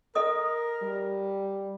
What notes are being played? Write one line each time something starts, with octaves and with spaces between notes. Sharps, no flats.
A4 A#4 D#5 D#6
G3